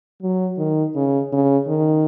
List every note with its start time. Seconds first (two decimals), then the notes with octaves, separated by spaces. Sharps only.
0.23 F#3
0.58 D#3
0.95 C#3
1.33 C#3
1.68 D#3